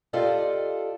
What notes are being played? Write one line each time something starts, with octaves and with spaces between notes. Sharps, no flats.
F4 G4 A4 D5 D#5